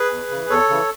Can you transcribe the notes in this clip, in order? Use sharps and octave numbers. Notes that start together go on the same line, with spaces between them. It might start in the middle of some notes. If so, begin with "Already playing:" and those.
Already playing: G#4 B4
E2
C#3 E3
E2 A4 C#5
C#3 E3